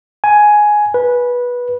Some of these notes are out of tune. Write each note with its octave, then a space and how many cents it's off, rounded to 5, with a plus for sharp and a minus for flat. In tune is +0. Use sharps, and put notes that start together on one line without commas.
G#5 +10
B4 -15